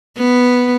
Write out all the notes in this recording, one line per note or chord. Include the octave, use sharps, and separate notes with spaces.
B3